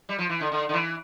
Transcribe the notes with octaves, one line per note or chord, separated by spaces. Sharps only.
G3
F3
E3
D3
D3
D3
E3